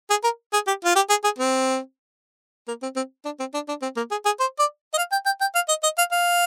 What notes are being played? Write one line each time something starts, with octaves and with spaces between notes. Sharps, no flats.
G#4
A#4
G#4
G4
F4
G4
G#4
G#4
C4
A#3
C4
C4
D4
C4
D4
D4
C4
A#3
G#4
G#4
C5
D5
D#5
F5
G5
G5
G5
F5
D#5
D#5
F5
F5